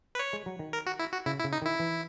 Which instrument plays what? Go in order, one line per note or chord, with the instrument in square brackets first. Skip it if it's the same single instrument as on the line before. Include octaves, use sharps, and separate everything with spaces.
[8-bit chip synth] B4
C#5
[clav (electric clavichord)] G#3
F#3
D#3
[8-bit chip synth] A#4
F#4
E4
F#4
[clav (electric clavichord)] C#3 [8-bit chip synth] E4
[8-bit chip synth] E4
[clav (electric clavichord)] C#3
[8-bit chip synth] D#4
[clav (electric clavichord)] D#3 [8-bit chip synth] E4
[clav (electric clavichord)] E3